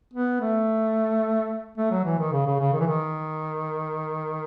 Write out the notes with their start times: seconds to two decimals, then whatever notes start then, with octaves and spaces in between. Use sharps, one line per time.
0.14 B3
0.41 A3
1.78 A3
1.91 F#3
2.05 E3
2.19 D#3
2.32 C#3
2.46 C#3
2.60 C#3
2.73 D#3
2.80 E3
2.87 D#3